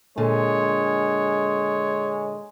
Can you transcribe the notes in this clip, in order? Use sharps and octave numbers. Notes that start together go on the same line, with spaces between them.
A#2 D3 G#3 C#5